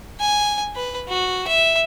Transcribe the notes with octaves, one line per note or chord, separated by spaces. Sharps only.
G#5
B4
F#4
E5